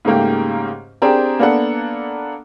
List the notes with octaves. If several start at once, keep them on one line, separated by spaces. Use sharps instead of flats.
G#2 C#3 A3 A#3 G4
C4 D4 G4 G#4 A#4
A#3 B3 D4 A4 F#5